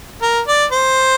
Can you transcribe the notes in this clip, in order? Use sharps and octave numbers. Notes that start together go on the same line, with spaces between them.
A#4
D5
C5